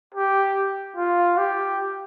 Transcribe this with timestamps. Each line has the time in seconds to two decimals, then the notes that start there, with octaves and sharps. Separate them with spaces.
0.14 G4
0.96 F4
1.38 G4